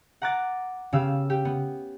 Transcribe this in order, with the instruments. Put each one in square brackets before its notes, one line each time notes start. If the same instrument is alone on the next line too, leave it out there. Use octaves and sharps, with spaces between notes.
[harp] F#5 A#5 D6 F#6 A6
C#3 B3 G4 F5 E6
G4
B3